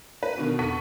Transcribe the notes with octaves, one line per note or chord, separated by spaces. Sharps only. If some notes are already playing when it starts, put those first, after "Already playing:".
B4
B2 D3 D#3
F1 A4 F#5 C#6 B6 D#7